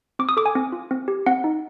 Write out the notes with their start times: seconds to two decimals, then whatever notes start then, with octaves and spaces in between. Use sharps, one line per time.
0.19 C4 D6
0.29 D#6
0.37 A4 D6
0.46 G#5
0.55 C4
0.72 F4
0.91 C4
1.08 G4
1.26 C4 F#5
1.44 D#4